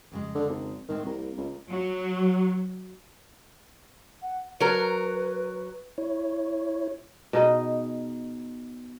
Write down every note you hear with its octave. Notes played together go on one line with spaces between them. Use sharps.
F2 C#3 G#3
D3
G#1
A2 D#3 G#3 C4
C2 A#3 A#4
C#2
F#3
F#5
F#3 A#4 B4
E4 C#5
B2 D#4 G#4 D#5